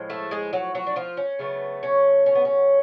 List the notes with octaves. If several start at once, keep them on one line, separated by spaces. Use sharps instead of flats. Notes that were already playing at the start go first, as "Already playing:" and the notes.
Already playing: A2 F3 G#3
A3 A4
G#3 G#4
F#3 F#4
F#3 F#4
D4
F3 F4
C#4
C#3 F#3 A3 B3
C#4
C#4
B3
C#4